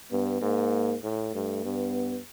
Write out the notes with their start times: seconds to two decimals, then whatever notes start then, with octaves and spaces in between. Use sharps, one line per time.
0.12 G2 B3
0.42 G#2 A#3
1.03 A2
1.34 G2 A3
1.65 G2 B3